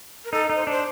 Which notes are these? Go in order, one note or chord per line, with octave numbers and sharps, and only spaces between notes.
A#4
D#4 A4
D#4
C5
D4 C5